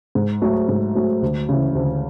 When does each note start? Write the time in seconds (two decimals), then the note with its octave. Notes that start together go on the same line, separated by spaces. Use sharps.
0.15 G#2
0.42 F#3 A3
0.68 G#2
0.95 F#3 A3
1.22 D2
1.49 C#3 E3
1.75 D2